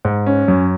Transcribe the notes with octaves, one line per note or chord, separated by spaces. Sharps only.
G#2
C#4
F#2